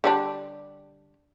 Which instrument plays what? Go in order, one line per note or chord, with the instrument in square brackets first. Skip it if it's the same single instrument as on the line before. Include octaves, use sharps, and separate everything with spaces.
[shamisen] D3 G3 D4